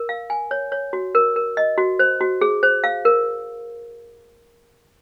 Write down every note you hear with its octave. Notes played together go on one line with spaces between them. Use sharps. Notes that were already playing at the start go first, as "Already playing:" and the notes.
Already playing: A#4
F5
G#5
C#5
C#5
F#4
A#4
A#4
D#5
F#4
C5
F#4
G#4
C5
F5
A#4